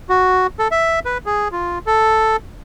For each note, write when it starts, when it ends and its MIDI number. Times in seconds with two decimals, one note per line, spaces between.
0.09 0.47 66
0.59 0.68 69
0.71 0.99 76
1.05 1.18 71
1.26 1.48 68
1.52 1.79 65
1.86 2.36 69